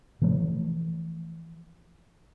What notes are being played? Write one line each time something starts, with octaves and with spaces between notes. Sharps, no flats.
E3 F3 A3